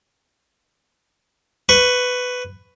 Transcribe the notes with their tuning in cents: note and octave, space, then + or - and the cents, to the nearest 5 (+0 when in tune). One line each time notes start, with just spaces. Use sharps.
B4 +10 C#6 +0